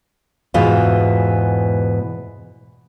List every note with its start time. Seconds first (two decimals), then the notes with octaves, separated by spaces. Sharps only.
0.54 E2 G#2 B2 E3 F4